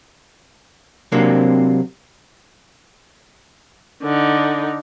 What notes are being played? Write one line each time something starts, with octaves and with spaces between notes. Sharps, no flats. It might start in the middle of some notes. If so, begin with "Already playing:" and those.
C3 F#3 A#3 C4 D4
D3 D#4